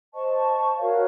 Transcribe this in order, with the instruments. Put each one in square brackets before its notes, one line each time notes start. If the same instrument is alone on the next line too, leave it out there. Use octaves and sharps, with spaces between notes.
[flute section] C5 D#5 A5 C#6
F#4 A#4 C#5 F5